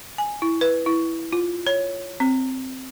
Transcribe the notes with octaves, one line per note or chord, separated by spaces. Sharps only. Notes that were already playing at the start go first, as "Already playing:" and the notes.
G#5
E4
B4
E4
F4
C#5
C4